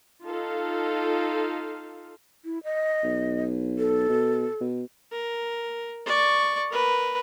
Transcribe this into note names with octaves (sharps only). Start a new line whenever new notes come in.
D#4 F4 A4 F5
E4
D#5
B1
A4
B2
B2
A#4
D5 C#6
A#4 B4